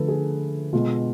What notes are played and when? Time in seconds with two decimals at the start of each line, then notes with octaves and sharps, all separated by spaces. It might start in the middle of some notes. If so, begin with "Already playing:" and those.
Already playing: D3 F3 A3 A4 B4
0.08 G#4
0.73 B2 G#3 F4